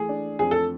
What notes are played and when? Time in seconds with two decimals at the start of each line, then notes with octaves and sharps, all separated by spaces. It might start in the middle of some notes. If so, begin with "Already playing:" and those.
Already playing: E3 A3 G#4
0.09 D4
0.39 F2 G#4
0.51 A4